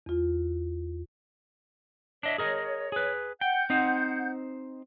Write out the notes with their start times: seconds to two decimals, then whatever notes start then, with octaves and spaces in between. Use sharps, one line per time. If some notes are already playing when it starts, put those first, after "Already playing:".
0.06 E2 F4
2.23 D4 C#5 D#5 E5
2.38 G#4 A#4 D#5
2.92 G#4 B4
3.41 F#5 G5 G6
3.70 C4 D#4 C5